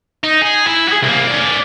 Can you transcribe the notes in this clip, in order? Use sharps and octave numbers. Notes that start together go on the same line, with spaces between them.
D#4
G#4
E4
F#4 G#4
C2 A#3
C#4 D5